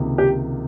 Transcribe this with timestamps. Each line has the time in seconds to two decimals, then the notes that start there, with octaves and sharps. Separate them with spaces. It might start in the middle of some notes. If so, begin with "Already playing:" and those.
Already playing: C#2 C3 D#3 A#3
0.18 G4